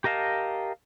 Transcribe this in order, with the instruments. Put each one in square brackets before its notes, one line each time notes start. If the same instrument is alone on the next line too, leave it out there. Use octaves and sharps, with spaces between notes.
[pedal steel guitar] G4 A#4 D#5 F5 A5